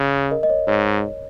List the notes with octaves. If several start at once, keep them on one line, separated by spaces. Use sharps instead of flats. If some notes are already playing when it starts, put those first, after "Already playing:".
Already playing: C#3
A#4 D#5
D#5
C#5
G#2 C#5